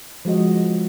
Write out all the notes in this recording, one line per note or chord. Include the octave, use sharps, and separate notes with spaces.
F3 G#3 F#4 D#5